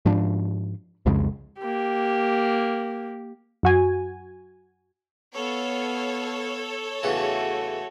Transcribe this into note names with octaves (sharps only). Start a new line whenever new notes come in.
G#2 F3 D4
C2 F2 C#3 G#3
A#3 G4
F#2 F#4 G#5
B3 A4 C#5 F5
E2 C#3 E3 A3 F#4